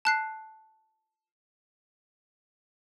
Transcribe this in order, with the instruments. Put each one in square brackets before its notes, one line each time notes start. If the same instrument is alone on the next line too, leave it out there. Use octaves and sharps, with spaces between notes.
[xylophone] A5 F#6 C7